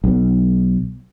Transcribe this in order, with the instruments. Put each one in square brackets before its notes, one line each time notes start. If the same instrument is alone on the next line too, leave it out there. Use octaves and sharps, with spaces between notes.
[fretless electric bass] B1 B3